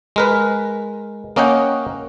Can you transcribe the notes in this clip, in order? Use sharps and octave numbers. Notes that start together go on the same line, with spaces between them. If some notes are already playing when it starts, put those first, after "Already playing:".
G#3 A#4 B4
A#3 C#4 D#5 F#5 G5